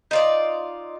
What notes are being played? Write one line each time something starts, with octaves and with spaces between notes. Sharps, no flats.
D#4 F4 D5